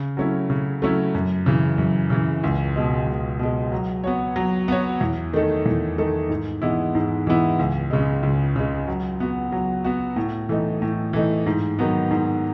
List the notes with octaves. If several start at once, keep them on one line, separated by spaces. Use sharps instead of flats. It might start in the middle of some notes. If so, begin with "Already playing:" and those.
Already playing: C#3
F#3 A3 C#4 E4
C#3
F#3 A3 C#4 E4
F#2
C#3 E3
F#2
C#3 E3
C#2
B2 G#3
C#2
B2 G#3
F#3
B3 F#4 C#5
F#3
B3 F#4 C#5
E2
D#3 A3 D#4 A4
E2
D#3 A3 D#4 A4
G#2
E3 G#3 B3 E4
G#2
E3 G#3 B3 E4
C#2
C#3 G#3
C#2
C#3 G#3
F#3
B3 F#4
F#3
B3 F#4
A2
E3 A3 D#4
A2
E3 A3 D#4
G#2
D#3 F#3 B3
G#2